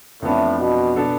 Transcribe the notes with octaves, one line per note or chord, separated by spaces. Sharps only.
F2 A2 E3 B3 D4
B2
B2 B3 D4 A4